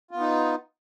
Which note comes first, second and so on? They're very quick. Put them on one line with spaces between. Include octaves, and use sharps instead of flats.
F4 B3 D#4